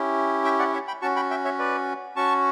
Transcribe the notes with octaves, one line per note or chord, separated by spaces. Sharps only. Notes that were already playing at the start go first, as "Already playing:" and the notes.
Already playing: C#4 E4 G4
E5 G5
D5 F#5
C#5 E5
G5 B5
C#4 F#4 A5 C#6
G5 B5
E5 G5
C#5 E5
B4 D5
C#4 F#4 A5 C#6